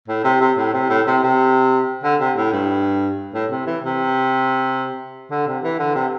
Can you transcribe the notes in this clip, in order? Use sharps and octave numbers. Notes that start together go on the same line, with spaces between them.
A2
C3
C3
A2
C3
A2
C3
C3
D3
C3
A2
G2
A2
C3
E3
C3
D3
C3
E3
D3
C3